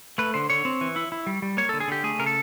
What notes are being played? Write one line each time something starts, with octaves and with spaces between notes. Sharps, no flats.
A3 B4
D3 C5
D3 C#5
C4
E3
E4
E4
G3
G3
A#3 C#5
D3 A4
G#4
D3 G4
A3 G#4
C#3 A#4
A4